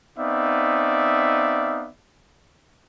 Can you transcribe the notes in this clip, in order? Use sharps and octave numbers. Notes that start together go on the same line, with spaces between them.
B3 C4 D#4 D5 E5 F5